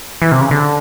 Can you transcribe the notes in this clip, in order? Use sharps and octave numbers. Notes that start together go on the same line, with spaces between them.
E3
C3
C#3
D3